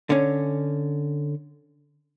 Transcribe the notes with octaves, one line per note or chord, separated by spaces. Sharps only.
D3 C#4